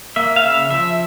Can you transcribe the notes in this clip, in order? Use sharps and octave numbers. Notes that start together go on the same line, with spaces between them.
A#3 E5
F5
C#3 E5
F3 E5